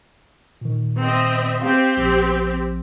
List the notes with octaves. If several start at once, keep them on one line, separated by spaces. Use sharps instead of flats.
A#2 D#3
C4 D#5 E5
C4 G4 F5
A#1 F3 E6